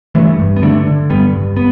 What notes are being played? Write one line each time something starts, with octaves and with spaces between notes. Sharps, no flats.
G2 E3 A3
G2
B3
D3 A3 D4
D3
G2 G3 B3
G2
B3